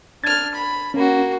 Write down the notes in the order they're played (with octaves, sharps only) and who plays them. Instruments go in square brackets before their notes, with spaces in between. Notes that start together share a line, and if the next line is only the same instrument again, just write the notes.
[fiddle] D4 F6 [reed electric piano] G#6 A6
[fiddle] B5
[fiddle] A#3 F#4 [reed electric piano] C#4